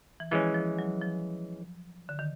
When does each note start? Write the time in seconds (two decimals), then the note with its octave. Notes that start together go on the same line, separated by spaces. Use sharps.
0.20 E3
0.31 E3 F3 G#3 C#4
0.55 F3
0.79 F#3
1.01 F3
2.09 D3
2.19 D#3